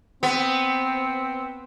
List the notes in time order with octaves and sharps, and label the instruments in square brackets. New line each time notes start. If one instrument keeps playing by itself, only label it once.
[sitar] B3 [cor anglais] C4